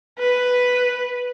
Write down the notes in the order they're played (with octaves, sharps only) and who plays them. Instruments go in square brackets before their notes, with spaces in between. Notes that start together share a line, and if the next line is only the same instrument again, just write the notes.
[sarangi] B4